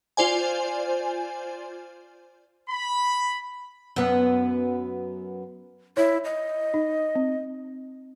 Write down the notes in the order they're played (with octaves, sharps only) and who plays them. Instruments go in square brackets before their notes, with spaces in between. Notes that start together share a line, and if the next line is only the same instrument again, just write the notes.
[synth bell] F4 C5 D5 G#5
[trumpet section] B5
[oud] F#2 B3
[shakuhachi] E4 [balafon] C#5
[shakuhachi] D#5
[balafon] D#4
C4